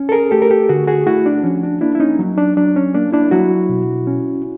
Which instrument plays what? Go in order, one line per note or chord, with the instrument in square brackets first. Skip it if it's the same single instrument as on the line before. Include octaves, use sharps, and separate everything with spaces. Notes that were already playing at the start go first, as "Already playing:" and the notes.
Already playing: [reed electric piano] C#4
A4
G#4 A#4
A3 G4 A4
A#4
G4 A4
D3 F#4 G#4
F#4 G#4
A3 E4 F#4
D4
F3 C#4
D4
A#3 D4 E4
E4
C#4 D#4
F#3
D4
F#3 D4
C#4
A#3 D4
D4 E4
F#3 E4 F#4
B2
C#4